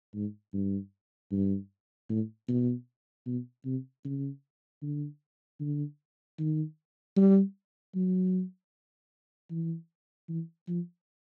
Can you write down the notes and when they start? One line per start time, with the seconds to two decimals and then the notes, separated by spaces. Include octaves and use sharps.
0.14 G#2
0.53 G2
1.31 G2
2.10 A2
2.49 B2
3.26 B2
3.65 C3
4.05 C#3
4.82 D3
5.60 D3
6.39 D#3
7.17 G3
7.95 F#3
9.51 E3
10.29 E3
10.68 F3